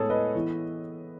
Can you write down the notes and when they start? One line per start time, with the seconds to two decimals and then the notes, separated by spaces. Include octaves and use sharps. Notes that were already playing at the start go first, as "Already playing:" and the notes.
Already playing: A2 G#3 B3 G#4 A4 C#5
0.10 B4 D#5
0.35 E3 B3 E4